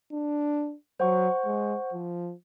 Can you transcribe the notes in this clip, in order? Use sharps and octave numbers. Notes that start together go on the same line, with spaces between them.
D4
F#3 C5 F#5 C#6
G#3
F3